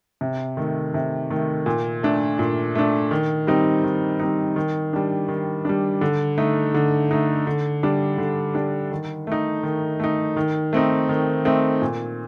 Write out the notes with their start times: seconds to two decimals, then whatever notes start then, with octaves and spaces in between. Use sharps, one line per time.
0.21 C3
0.57 D#3 A3
0.94 C3
1.30 D#3 A3
1.66 A#2
2.03 A3 D4
2.39 A#2
2.75 A3 D4
3.11 D#3
3.47 G3 C4 D#4
3.84 D#3
4.19 G3 C4 D#4
4.56 D#3
4.93 G3 D4
5.29 D#3
5.65 G3 D4
6.01 D3
6.38 A3 D#4
6.74 D3
7.11 A3 D#4
7.47 D3
7.83 G3 D4
8.18 D3
8.55 G3 D4
8.92 D#3
9.27 A3 D#4
9.63 D#3
10.00 A3 D#4
10.37 D#3
10.73 A3 C4 D#4
11.09 D#3
11.45 A3 C4 D#4
11.81 A#2